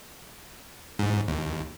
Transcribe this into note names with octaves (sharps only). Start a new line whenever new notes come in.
G#2
D#2